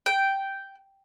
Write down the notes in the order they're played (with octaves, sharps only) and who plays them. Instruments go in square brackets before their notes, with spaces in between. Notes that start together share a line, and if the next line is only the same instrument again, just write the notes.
[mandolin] G5